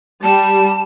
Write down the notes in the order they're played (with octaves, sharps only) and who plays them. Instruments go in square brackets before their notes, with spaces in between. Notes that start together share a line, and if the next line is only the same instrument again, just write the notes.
[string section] G3 [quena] A5